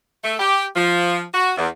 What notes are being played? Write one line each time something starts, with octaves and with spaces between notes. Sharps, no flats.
A3
G4
F3
F#4
E2